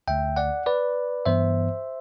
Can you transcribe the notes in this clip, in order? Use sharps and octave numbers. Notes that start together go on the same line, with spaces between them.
D2 D3 A3 E5 G5
D5 F#5
B4 D5
G2 E3 B3 C5 E5